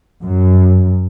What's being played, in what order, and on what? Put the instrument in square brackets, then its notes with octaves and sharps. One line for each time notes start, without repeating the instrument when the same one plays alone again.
[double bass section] F#2